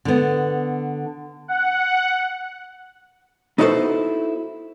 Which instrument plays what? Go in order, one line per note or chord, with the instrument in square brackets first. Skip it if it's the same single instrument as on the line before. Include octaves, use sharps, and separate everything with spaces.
[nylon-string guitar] D3 B3
[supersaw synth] F#5
[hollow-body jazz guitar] B3 D#4 E4 F#4 A4 C5